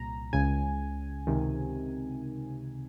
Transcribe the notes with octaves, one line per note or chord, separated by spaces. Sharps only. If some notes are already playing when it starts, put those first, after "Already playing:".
Already playing: C2 A#2 A#5
C#2 C#3 G#5
C#2 C3 D#3